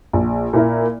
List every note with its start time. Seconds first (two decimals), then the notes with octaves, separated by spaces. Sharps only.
0.13 A#1
0.53 A#2 A#3 E4 A#4